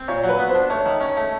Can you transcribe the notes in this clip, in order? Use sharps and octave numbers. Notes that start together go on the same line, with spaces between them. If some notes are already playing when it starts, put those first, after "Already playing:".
Already playing: C4
A#2 C#5
F#3
B4
B3
C5
D4
A3 C#5
D#3
C#4 C#5
A3